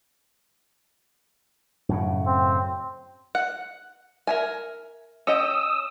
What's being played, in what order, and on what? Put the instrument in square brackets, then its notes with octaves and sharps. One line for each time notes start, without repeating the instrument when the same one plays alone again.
[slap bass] F#2 A2 C#3
[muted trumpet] C4
[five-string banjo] F#5
A#4 E5 G#5
[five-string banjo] C#4 D#5 G5 [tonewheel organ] D#6 E6